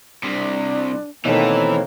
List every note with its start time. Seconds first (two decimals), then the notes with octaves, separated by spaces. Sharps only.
0.23 C2 C3 D4
1.25 B2 D#3 E3 A3 A#3 C4 C#5